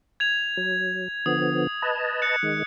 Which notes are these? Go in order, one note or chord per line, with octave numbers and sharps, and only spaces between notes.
G#6 F7
F#3
D3 F3 B3 D#6
B4 D#5 A5
F#6 C#7
D#3 G#3